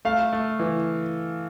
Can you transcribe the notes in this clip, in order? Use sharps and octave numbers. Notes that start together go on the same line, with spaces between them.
A3 F5
A3
E3